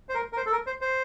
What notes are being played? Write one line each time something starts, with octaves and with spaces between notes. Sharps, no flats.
C5
A#4
A#4
C5
A4
A#4
C5
C5